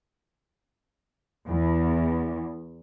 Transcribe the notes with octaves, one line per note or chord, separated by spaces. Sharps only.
E2